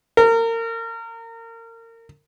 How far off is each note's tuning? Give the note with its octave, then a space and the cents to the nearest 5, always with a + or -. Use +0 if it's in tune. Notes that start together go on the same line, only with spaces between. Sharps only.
A#4 -30